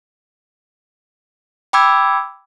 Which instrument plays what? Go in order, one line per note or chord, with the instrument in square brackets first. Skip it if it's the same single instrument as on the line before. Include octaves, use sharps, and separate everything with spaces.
[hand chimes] G5 B5 D6 E6 G#6